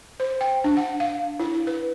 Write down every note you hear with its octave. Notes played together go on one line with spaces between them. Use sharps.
C5
G5
D4
F#5
F5
E4
B4